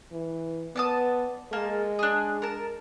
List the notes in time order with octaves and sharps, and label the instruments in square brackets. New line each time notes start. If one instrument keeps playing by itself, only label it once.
[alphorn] E3
[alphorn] B3 [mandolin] D5 A5 D#6
[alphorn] G#3 [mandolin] A#3 A5
[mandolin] D4 G#4
A#4 A5